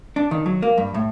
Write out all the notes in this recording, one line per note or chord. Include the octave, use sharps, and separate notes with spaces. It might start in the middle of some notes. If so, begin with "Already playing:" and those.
D4
D#3
F#3
A#3
G2
A2